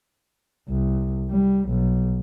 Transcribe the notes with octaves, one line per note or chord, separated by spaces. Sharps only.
C2
G3
B1